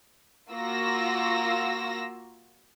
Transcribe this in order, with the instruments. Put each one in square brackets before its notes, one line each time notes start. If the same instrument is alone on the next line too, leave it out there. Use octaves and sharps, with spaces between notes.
[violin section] A#3 F4 F#4 E6 A#6